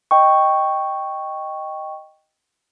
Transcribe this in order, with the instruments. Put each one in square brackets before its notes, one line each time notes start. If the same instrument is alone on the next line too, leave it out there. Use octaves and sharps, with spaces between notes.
[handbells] D#5 G5 C#6